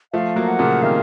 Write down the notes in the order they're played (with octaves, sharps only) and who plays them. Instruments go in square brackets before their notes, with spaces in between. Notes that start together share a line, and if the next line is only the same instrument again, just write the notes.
[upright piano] F3 A3 [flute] F5
[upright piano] F#3 A#3
[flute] F#5
[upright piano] A#2 C#3
[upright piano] C3 D#3 [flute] F5